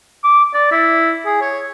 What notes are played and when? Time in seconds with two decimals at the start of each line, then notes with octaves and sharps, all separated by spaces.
0.24 D6
0.54 D5
0.71 E4
1.26 G#4
1.41 C#5